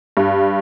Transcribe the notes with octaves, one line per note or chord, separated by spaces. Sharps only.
G2